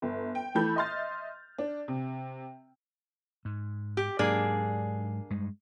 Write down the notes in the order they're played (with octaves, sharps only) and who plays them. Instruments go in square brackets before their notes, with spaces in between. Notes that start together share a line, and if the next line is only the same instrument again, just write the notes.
[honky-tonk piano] G1
G5
E3 A3 A4 B5 G6
D#5 E5 C6 F6 A6
D4
C3
[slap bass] G#2
[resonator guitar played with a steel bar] G4
[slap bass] G#2 F#3 [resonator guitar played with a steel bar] A#3 D4 G#4
[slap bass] G2 G#3